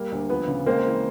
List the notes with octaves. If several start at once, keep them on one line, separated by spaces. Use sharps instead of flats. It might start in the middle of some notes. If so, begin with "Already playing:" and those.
Already playing: G3 A#3
D2
F3 B3
C#3
G#3 A#3 C4
E3